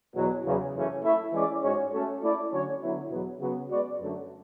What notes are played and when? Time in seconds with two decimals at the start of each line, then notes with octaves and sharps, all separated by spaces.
0.14 E2 B2 F#3
0.44 E2 C#3 F#3
0.73 F#2 C#3 E3 A3 C#4
1.03 A3 E4 A4 E5
1.33 E3 G#3 C#4 G#4 D5
1.62 G#2 G#3 C#4 F#4 C#5
1.92 A3 C#4 F#4 A4
2.21 A3 E4 A4 D5
2.51 D3 F#3 C#4 F#4 C#5
2.81 D3 F#3 B3 E4
3.10 E2 B2 F#3 B3
3.40 C#3 F#3 B3 F#4
3.70 G#3 B3 F#4 B4 D5
3.99 F#2 D3 F#3 A3